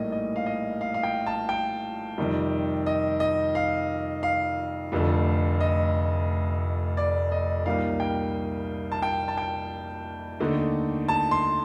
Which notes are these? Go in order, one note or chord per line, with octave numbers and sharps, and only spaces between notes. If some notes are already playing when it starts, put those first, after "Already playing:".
Already playing: A#1 A2 G3 A#3 D#4 D#5
D#5
F5
D#5
F5
F5
G5
A5
G5
F2 C3 D#3 G3
D#5
D#5
F5
F5
F1 F2 D3 A3
D#5
D5
D#5
C2 A#2 G3 A#3 D#4 F5
G5
A5
G5
A5
G5
D#2 D3 A3 D#4
A5
C6